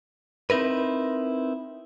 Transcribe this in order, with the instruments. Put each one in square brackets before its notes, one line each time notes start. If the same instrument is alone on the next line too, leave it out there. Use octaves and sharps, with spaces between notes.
[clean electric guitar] C4 D#4 E4 A#4 B4